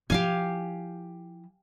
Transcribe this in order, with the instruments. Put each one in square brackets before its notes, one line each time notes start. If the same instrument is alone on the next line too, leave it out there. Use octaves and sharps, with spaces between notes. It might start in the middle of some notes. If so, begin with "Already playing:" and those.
[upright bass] F3 E4 [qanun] G4 F5 G#5